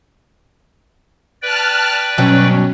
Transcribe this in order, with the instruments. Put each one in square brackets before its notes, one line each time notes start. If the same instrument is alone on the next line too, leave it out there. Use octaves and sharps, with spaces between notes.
[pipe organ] B4 D5 G5 [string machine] A5 F6 F#6
[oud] G2 B2 F#3 [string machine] C#4